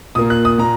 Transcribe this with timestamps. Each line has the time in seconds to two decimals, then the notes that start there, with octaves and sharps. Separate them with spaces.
0.15 A#2 A#3 D#6
0.30 F#6
0.45 D#6
0.58 A#2 A#5